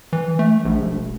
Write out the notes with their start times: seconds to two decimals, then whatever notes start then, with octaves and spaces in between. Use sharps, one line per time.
0.13 E3
0.39 A3
0.65 A#1
0.82 E1